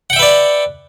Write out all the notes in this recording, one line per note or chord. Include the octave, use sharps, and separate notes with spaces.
B4 D5 E5 F#5 G5